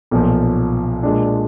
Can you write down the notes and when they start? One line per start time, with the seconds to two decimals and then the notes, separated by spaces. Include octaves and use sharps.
0.11 B1 A#2 F3
1.03 A#2 G#3 D4